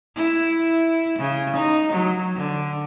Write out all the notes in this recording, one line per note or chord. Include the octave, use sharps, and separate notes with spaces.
E4
C#3
D#4
F#3
D3